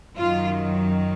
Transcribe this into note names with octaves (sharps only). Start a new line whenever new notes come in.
F#2 D#3 F#3 F4